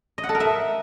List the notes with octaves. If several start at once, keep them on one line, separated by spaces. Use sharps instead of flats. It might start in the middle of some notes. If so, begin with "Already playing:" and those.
D#5
F#5
A4
A#4
E5